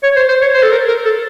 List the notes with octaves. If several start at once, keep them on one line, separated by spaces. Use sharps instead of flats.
C#5
C5
C5
C#5
C5
A4
A#4
A#4
A4